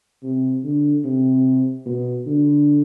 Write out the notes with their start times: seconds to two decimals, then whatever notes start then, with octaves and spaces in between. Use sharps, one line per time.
0.23 C3
0.64 D3
1.04 C3
1.86 B2
2.27 D3